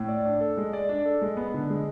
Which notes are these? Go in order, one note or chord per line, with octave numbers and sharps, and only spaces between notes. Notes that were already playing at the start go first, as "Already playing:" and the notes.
Already playing: A2
D5
D4
A4
G#3
D5
D4
A4
G#3
B3
D3
G#3